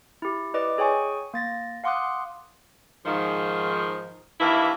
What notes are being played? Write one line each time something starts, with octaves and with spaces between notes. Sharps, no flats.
E4 G4
E4 B4 D5 D#5 D6
G#4 C#5 G5 G#5 C#6
A#3 A6 A#6
F5 F#5 C6 D6 D#6 F#6
G#2 D#3 F3
G2 D#3 E3 A#3 E4